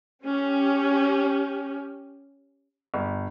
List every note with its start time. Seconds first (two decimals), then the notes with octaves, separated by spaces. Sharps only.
0.24 C#4 G4
2.94 G1